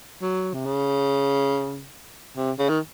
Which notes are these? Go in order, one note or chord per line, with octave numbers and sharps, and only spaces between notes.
F#3
C3
C#3
C3
C#3
D#3